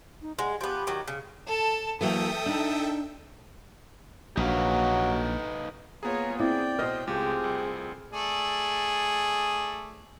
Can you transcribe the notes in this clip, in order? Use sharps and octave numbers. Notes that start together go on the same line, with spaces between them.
D#4
G#3 F#5
F3 B3 G4
D#3 F#3
C#3
A4 A5
E3 F#3 A#3 A4 E5 G5 D#6
D4 D#4
A#1 F#3 D#4 B4 F5
A#3 B3 F4 G#4 C#5 A#5
C4 E4 D5 G5
B2 B4 C5 D#5 F6
C#2 A3 C4 F4 G4 G#4
C2
A3 G#4 D5